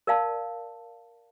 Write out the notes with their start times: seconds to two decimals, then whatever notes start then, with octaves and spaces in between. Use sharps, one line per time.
0.07 A#4 D5 F5 A5